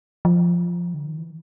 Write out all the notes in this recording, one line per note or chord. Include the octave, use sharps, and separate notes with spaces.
F3
D3
D#3
E3